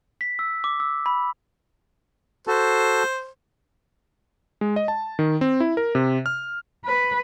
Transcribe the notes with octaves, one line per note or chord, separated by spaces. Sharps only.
B6
E6
D6
E6
B5
F#4 A4 C5 A5
G#3
D#5
A5
D#3
C4
E4
A#4
C3
F6
B4